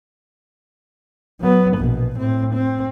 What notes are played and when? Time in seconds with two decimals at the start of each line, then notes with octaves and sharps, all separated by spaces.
1.40 F#3 B3
1.76 A#1 B2
2.17 A2 C4
2.53 C4